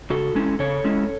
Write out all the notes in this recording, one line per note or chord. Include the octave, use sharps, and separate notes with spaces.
C#3 F#4 A4
G#3 C#4 E4
C#3 A4 C#5
G#3 C#4 E4